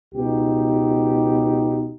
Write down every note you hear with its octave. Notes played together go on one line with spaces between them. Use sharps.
C#2 B2 D#4 G4